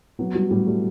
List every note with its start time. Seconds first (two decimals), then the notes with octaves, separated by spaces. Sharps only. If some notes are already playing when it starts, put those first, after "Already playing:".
0.19 F#3 B3
0.35 G3 F#4
0.51 A2 G3
0.67 G3 A3